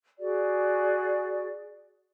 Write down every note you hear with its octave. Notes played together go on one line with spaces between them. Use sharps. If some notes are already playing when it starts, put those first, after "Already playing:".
F#4 G#4 D5